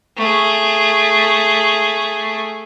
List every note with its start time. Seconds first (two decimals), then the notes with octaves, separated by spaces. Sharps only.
0.17 A3 G#4